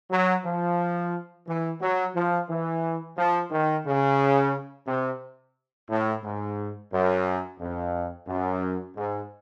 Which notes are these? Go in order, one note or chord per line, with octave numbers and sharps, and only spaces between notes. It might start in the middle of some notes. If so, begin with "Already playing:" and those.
F#3
F3
E3
F#3
F3
E3
F3
D#3
C#3
C3
A2
G#2
F#2
F2
F#2
G#2